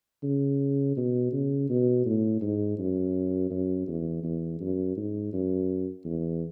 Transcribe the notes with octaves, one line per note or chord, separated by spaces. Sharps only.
C#3
B2
C#3
B2
A2
G#2
F#2
F#2
E2
E2
F#2
G#2
F#2
E2